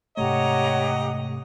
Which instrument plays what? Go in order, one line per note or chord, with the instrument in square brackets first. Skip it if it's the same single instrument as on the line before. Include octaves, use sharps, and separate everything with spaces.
[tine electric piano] G#2 C3 A3 [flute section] G4 F#5 A#5 [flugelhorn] C#5 [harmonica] D#5